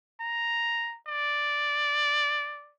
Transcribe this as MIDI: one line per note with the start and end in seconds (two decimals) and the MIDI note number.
0.21 0.96 82
1.09 2.73 74